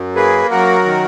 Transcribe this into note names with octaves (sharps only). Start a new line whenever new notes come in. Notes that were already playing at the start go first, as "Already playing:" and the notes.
Already playing: F#2
A#3 G#4 B4
F#2 F#4 A#4
D#3